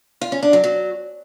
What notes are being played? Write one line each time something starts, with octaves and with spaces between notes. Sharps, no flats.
F4
C#4
D4
F#3
F#3